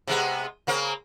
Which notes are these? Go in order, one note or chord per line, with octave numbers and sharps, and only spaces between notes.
C3 G#3 B3
C#3 A#3 C4